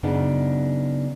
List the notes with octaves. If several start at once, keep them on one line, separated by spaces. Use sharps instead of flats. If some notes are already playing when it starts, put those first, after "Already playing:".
F#2 C#3 B3 D4 D#4